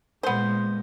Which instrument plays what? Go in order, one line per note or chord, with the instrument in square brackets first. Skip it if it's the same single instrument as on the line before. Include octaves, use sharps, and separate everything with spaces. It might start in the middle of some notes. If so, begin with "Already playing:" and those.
[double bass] A#2 G#3 [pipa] B3 C5